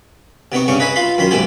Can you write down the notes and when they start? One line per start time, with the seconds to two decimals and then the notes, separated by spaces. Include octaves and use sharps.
0.52 C3 B3 D#4 C#6
0.68 G2 C#3 D#4 C#6
0.80 B4 D#5 E5 G#5 B5
0.96 F4 F5 B5 C6
1.18 F#2 D#3 B5 C6
1.31 B1 G#2 E4 G4 G#5